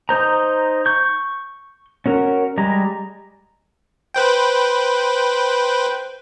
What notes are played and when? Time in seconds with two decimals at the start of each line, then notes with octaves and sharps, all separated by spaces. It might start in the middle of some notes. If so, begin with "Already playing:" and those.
0.09 D#4 C5 A#5
0.86 C#6 G6
2.06 C#4 F#4 A#4
2.58 G3 G#3 A#5
4.14 B4 C5 G5